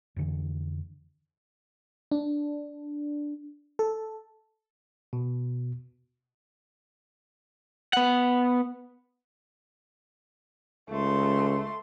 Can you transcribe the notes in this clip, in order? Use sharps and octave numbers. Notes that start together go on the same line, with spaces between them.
F2 D3 E3
D4
A4
B2
B3 F#5
C#2 A3 C6